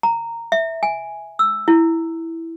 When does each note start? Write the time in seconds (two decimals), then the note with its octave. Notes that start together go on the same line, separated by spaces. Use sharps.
0.03 A#5
0.52 E5
0.83 G#5
1.39 E6
1.68 E4